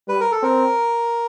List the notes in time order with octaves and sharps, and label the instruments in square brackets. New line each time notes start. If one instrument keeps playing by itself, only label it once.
[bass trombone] G3 [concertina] B4
[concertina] A#4
A4
[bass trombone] C4 [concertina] A#4